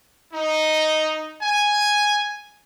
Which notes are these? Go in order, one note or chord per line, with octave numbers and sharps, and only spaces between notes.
D#4
G#5